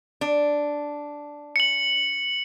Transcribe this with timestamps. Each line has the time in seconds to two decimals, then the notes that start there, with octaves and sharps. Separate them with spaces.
0.21 D4
1.56 C#7 F#7